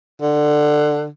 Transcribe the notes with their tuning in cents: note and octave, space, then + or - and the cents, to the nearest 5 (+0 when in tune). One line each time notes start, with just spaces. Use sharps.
D3 +20